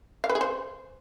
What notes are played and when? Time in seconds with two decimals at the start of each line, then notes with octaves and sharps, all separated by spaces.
0.24 F5
0.29 B4
0.35 G#4
0.41 C5